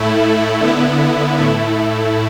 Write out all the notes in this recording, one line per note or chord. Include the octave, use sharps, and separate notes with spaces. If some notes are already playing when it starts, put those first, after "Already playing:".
Already playing: A2 A3 E4
D3 B3 E4
A2 A3 E4